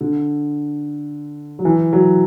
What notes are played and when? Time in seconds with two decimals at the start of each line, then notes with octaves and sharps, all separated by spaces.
0.01 D3
1.59 F#3
1.65 E3
1.93 F#3